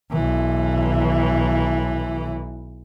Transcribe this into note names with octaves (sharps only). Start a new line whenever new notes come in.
B1 E3